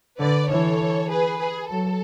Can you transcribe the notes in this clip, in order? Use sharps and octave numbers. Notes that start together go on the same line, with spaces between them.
D3 B4 D5
E3 A4 C#5
G#4 B4
G#4
F#3 A4